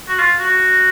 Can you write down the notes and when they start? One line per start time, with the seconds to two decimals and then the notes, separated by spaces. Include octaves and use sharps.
0.08 F#4
0.19 F4
0.39 F#4